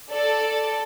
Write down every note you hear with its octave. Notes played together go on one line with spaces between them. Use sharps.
A4 D5